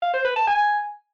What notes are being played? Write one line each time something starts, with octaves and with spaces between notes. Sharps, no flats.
F5
C5
B4
A5
G#5